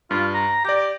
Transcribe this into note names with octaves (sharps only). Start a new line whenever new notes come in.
G2 F4
A#5
G4 D5 A#6